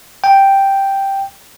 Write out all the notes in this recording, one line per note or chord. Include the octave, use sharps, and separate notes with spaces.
G5